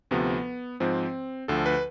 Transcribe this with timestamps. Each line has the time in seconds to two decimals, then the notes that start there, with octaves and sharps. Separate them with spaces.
0.11 D2 C3 F3 B3
0.80 G#2 F3 C4
1.48 D2 D3 F3 A4
1.66 B4